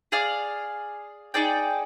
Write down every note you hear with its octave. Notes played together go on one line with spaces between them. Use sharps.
G#4 D5 F5
D#4 G#4 D5 G5